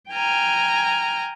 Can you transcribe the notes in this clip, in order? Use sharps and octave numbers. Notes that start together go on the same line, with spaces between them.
G5 G#5 A#5 F6